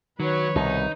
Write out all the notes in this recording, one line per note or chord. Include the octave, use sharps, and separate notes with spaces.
D#3 F#3 B4 C#5
C2 B2 D#4